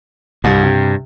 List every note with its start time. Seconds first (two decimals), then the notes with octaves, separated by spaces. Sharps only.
0.44 C2 G2
0.63 C3